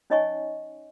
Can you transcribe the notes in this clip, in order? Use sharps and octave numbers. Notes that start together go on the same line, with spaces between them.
C#4 D#4 C#5 D#5 G#5 C#6